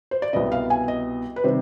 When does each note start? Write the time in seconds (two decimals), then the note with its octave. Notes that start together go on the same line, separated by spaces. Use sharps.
0.11 C5
0.22 D5
0.33 C2 B2 B3 D#5
0.52 F5
0.70 G#5
0.88 D#5
1.36 B4
1.44 C3 D#3 G3 C5